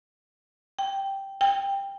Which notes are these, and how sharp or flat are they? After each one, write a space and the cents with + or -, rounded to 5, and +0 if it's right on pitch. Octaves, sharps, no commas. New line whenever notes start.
G5 -5
G5 +15